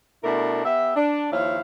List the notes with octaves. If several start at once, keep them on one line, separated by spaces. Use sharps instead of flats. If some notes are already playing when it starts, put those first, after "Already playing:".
B2 A3 D4 E4 A#4
B3 G4 E5
D4
D#2 F3 E4 C#5 F5